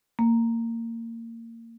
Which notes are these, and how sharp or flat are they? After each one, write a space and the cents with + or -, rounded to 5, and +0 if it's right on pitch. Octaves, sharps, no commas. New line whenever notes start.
A#3 -25